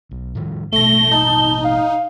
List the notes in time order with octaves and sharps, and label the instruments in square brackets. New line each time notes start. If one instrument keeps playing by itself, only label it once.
[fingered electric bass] B1
A2 D#3 F3
[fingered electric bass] A1 B2 [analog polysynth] A3 A#6 [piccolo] G7
[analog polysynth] D#4 [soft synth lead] A5
[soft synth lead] F5